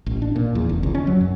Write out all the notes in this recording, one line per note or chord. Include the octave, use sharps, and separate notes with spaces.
A1
D4
A#2
E2
F1
C#2
C#4
F#3
F#2